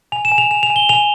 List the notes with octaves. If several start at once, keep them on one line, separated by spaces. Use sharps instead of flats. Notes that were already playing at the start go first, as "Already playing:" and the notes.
G#5 F7
E7
G#5
F7
G#5 F7
F7
G#5
G7
G#5 F7